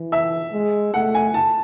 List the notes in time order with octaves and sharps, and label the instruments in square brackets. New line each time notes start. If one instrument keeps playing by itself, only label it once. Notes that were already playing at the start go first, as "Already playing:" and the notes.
Already playing: [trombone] E3
[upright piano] E5
[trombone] G#3
[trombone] A3 [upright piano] F#5
[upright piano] G#5
A5